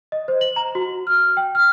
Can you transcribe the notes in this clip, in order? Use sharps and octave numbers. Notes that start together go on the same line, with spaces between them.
D#5
C5
F#7
A#5
F#4
F6
G5
F6